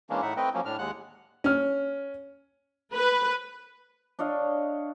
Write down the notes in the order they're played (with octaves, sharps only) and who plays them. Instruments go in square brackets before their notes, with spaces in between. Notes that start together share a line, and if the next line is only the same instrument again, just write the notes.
[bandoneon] E3 G#3 A#3 C#4 D4
A2 D#4 E5 F#5
A3 C4 B4 D#5 G5
F3 F#3 A#3 C#4
A2 D4 F6
D#2 G#3 F#5 F#6
[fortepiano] C#4 F6
[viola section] B4
[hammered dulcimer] D4 C#5 D#5 F5